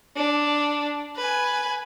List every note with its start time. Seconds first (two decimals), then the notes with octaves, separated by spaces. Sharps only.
0.16 D4
1.17 B4 G#5